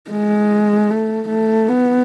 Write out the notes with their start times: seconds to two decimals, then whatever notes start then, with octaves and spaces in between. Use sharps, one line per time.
0.11 G#3
0.90 A3
1.29 A3
1.69 B3